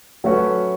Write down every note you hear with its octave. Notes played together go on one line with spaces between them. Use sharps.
F#3 A3 C#4 F#4 B4